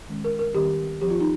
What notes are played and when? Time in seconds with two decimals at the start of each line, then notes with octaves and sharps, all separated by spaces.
0.08 D#3 G#3 C#4
0.25 A#4
0.39 A#4
0.54 D#3 G3 C4 G4
1.01 F3 C4 G4
1.10 F4
1.20 D#4